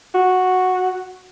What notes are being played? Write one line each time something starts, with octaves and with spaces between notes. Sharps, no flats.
F#4